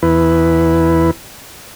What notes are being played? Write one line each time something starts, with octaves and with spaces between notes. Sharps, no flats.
E2 E4 B4